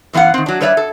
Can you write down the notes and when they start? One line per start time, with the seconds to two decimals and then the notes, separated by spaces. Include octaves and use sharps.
0.13 F#2 E3 B3 F5 F#5
0.34 D#3 C4
0.46 F#3 D4
0.61 G3 B4 C#5 D5 E5
0.77 A4